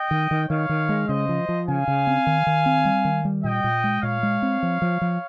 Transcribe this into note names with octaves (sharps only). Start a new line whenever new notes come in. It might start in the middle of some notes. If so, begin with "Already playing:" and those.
Already playing: D#5 G5
D#3
D#3
D#3 C#5 F5
D#3
G#3
C#3 C5 D#5
F3
F3
C#3 F5 G#5
C#3
C4
D#3
D#3
C4
G3
D#3
G3
A#2 D#5 G5
A#2
G#3
A#2 C#5 F5
G#3
C4
F3
F3
F3